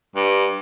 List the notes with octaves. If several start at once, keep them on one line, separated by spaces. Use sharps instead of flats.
G2